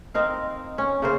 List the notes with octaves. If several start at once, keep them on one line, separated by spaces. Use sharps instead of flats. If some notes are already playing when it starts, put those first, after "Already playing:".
C4 D#4 A#4 F5
C#4
C#3 A#3 C5